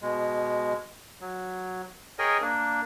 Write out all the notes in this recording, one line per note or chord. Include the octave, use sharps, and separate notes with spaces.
B2 G#3
F#3
G#4 A#4 C#5 D#5 G5 G#5
A#3 D4